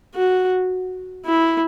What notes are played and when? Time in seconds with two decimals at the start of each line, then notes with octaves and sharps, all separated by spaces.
0.15 F#4
1.26 E4